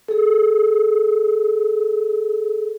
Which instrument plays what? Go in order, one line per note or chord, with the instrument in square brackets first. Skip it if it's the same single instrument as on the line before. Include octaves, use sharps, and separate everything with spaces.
[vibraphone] G#4 A4